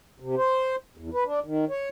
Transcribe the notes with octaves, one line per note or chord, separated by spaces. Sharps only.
C3
C5
E2
B4
D4
D#3
C#5